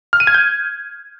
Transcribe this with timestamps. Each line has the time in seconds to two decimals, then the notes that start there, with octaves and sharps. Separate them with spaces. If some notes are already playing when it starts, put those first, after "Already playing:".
0.13 F6
0.20 D#7
0.27 G#6
0.34 G6